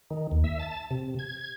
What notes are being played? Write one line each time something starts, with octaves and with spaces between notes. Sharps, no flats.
D#3
D#2
E5
A5
C3
G#6
G#6